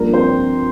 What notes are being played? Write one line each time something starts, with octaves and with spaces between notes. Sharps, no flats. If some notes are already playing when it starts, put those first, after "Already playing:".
Already playing: G2 F3 A#3 D4 A#4
C4 C5